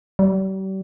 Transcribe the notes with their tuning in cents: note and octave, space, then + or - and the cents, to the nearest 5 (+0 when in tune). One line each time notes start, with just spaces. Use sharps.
G3 -40